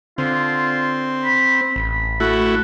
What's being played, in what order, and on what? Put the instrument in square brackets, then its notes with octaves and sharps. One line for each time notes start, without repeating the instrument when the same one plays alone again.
[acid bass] D3 [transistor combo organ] C4 [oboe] F4
[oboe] B5
[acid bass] A1 [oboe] B5
[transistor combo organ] A3 E4 F#4